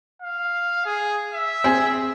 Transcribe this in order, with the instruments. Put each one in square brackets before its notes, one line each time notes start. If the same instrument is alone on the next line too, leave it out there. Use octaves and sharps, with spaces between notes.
[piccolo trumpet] F5
G#4
E5
[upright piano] C4 G#4